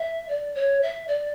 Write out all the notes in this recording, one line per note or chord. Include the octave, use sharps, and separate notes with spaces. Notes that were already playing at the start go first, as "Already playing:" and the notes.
Already playing: E5
D5
C#5
E5
D5